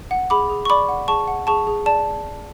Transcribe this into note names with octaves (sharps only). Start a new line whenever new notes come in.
F#5
G#4 B5 D6
G#4
C#6
D5 B5 D6
F#5
G#4 A5 C#6
F#5
G#4 A5 C#6
G#4
D5 A5